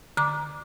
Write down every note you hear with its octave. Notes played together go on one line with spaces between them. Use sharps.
D3 A#5 D6